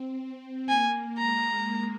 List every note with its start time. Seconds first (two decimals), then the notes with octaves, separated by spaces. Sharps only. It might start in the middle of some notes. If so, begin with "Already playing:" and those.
Already playing: C4
0.18 C4
0.69 A#3 G#5
1.18 G#3 A#5